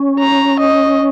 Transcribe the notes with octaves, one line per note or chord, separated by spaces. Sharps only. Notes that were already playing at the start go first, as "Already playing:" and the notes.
Already playing: C#4
A#5
D#5